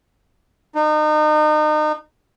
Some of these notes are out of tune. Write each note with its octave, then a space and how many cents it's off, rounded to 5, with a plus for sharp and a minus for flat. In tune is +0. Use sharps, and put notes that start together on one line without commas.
D#4 -35